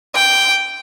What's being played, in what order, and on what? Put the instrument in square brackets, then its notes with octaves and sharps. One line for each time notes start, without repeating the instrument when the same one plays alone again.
[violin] G5